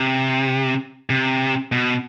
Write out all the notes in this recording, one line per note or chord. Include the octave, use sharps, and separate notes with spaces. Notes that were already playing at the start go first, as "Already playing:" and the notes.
Already playing: C3
C3
B2